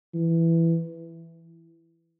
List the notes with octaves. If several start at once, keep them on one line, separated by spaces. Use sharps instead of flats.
E3